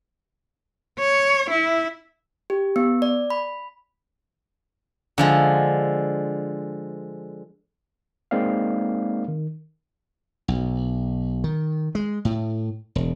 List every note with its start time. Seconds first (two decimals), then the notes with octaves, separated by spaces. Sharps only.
0.99 C#5
1.50 E4
2.50 G4
2.76 B3
3.02 D5
3.30 B5
5.18 D3 F3 G#3
8.31 G#3 A#3 C4 D#4 D5 F5
9.28 D#3
10.48 B1
11.44 D#3
11.95 G#3
12.25 A2
12.95 E1